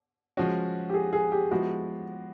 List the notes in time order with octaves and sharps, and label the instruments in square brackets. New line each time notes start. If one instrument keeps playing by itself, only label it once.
[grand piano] F3 G#3 C#4 F#4
[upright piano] G4
G#4
G#4
G4
[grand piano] F3 G#3 B3 E4 G4 [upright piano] F#4